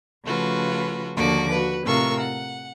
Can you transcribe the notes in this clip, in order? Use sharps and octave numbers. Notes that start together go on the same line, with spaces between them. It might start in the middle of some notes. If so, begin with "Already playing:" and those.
C#3 F3 A3 F4 F#4 B4
D#2 D3 F3 A#3 F#4 D6
F#4 B4
A2 C3 F4 A#4 C#6 E6
F#5